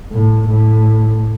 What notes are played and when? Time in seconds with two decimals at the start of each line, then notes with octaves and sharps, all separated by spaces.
0.12 A2
0.49 A2